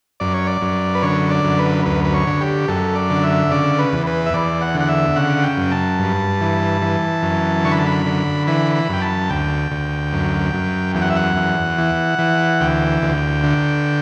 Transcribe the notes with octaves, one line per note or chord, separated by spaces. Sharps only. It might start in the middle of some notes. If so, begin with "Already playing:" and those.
F#2 D5
C#5
D5
F#2
B4
D3 C#5
D5
F#2
B4
D2 B4
B4
C#5
D3
G4
F#2 A4
D5
D3
E5
C#3 D5
B4
E2
B4
E5
E2 D5
F#5
D3
F#5
E5
C#3 F#5
G5
F#2
A5
G2
E3
E3
F#2
D3 C#6
B5
A5
B5
D3
E3 B5
B5
F#2 G5
A5
D2 G5
D2
F#2
F#2
E2 G5
F#5
E5
F#5
E2
E3
E3
D2 G5
D2
D3